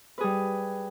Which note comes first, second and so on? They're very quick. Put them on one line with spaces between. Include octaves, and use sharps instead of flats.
B4 G#4 G3